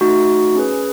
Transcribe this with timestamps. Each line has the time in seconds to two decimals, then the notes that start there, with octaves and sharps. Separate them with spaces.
0.01 A3 D#4 F#4
0.55 C#4 G#4 B4